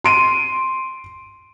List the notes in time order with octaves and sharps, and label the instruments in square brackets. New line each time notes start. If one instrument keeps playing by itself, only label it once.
[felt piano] C6 D7 D#7